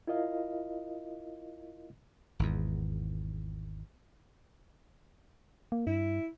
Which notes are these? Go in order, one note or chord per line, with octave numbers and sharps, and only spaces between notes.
E4 F4 A#4 D#5 F5
G#1 E2
A#3
G2 E4